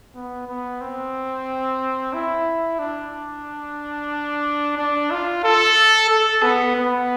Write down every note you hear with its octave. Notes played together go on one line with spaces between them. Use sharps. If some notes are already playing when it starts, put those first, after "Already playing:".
B3
B3
C4
E4
D4
D4
F4
A4
A4
B3
B3